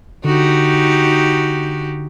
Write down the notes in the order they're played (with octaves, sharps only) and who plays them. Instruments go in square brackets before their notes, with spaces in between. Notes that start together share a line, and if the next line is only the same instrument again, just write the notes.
[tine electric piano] D3 [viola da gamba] D#4 F#4 G4